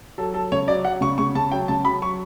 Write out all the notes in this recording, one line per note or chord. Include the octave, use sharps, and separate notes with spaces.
F#3 A4
F#3 A4
C#3 C#5
F#3 D5
F#3 F#5
C#3 C#6
C#3 C#6
C#3 A5
F#3 G5
C#3 A5
F#3 B5
F#3 C#6